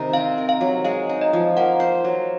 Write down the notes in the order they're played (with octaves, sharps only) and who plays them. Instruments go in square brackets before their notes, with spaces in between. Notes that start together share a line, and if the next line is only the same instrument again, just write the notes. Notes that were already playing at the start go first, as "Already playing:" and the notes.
Already playing: [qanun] C3 D#3 D#4
[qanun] C4 [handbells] F5
[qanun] A#4
[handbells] F5
[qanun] F#3
[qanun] G#3 [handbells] F5
[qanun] D#4
[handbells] D#5
[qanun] F3
[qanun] A#3 [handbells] F#5
[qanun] C5
F#3